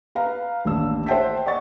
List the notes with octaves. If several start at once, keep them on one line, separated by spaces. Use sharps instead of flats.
B4 F5 A#5
A1 D#2 D4 E6
C5 E5 F#5 G5 A5 B6
D5 D#5 F#5 C#6 A6